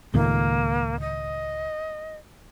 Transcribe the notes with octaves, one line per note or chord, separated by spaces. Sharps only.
C#2 A2 D#3 A#3
D#5